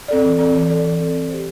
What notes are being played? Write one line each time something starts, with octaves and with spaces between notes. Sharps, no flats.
C4 A4 D5
E3
C4 A4 D5
E3
C4 A4 D5
E3
C4 A4 D5
C4
G4 C5